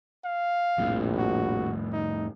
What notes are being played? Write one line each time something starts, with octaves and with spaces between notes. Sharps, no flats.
F5
A#1 F2 A2
F#4
D#4